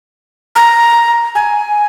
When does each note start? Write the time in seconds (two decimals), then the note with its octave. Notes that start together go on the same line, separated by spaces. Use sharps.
0.56 A#5
1.35 G#5